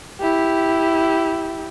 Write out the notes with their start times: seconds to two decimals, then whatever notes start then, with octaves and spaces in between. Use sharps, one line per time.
0.21 E4 G4